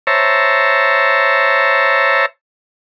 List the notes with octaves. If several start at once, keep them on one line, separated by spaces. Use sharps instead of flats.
C5 C#5 E5 A5 A#5